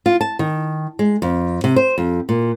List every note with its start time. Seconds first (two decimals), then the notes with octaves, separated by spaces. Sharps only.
0.06 F4
0.21 A5
0.39 D#3
0.99 G#3
1.22 F2
1.64 C3
1.76 C5
1.98 F2
2.29 A#2